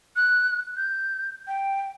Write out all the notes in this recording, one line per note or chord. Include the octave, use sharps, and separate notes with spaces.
F#6
G6
G5